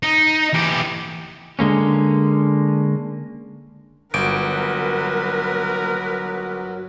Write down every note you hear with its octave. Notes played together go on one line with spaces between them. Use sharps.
D#4
E2 G4
D3 G#3 A#3 C#4
G1 F#3 A#4 B4 D7